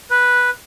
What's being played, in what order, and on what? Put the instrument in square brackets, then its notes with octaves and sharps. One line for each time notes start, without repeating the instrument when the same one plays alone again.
[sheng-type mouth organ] B4